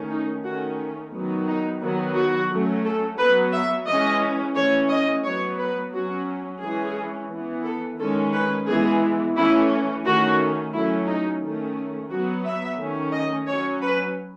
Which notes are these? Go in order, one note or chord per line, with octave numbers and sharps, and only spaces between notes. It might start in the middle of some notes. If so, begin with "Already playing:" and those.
Already playing: D#3 A3 C#4
D#4
D#3 A3 C#4 F#4
D#3 F#3 B3
D#4
D#3 F#3 B3
F#4
F#3 A3 C#4
A4
F#3 B3 B4
E5
E3 G#3 C#4 D#5
E3 A3 C#4 C#5
D#5
F#3 B3 C#5
B4
F#3 C#4 F#4
E3 G#3 C#4 G#4
E3 B3
A4
D#3 G#3 C#4 A4
B4
E3 G#3 B3 G#4
E3 A3 C#4 E4
D#3 A3 C#4 F#4
F#3 A3 C#4 E4
D#4
D#3 A3 C#4
F#3 B3 F#4
E5
D#3 A3 C#4
D#5
F#3 C#4 C#5
B4